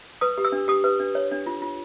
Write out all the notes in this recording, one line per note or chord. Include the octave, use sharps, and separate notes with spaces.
B4 D#6
G4
E6
D4
G4 D#6
B4
D4
C#5
D4
F4
F4